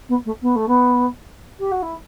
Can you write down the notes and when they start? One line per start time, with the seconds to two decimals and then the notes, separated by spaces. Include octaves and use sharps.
0.09 B3
0.25 A3
0.42 B3
0.56 A3
0.68 B3
1.59 G4
1.72 F#4
1.82 E4